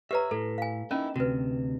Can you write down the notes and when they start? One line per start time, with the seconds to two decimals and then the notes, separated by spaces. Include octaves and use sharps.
0.11 G4 B4 C#5 E5 A#5
0.31 A2 A4
0.58 F5 G#5
0.91 A#3 C#4 D#4 E4
1.16 D2 C3 F#4 B4